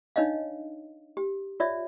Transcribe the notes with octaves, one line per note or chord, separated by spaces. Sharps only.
D4 D#4 C#5 D#5 F5
G4
F4 C#5 D5 E5